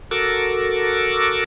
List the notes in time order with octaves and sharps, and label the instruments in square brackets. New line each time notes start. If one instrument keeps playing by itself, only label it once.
[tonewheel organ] F#4 A4 A#4 D6 E6